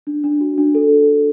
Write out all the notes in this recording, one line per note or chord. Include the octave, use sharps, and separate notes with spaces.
D4
D4
F#4
D4
A4